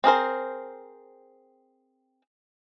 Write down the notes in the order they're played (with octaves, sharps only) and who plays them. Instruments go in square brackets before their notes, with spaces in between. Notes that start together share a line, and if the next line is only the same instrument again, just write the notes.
[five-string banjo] C4 G#4 A#4 C5